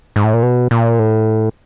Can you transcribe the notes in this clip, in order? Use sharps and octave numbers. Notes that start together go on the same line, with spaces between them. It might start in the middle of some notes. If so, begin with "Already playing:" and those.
G#2
A2
A#2
B2
A#2
A2